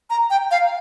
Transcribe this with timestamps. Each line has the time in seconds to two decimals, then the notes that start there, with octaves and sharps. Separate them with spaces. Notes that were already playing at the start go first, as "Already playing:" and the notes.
0.10 A#5
0.30 G5
0.51 F5